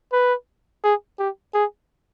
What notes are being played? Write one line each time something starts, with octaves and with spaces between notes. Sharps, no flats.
B4
G#4
G4
G#4